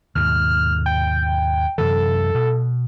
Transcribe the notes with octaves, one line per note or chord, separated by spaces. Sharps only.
D#2 G#2 B2 F6
G5
F#2 C3 E3 A4
B2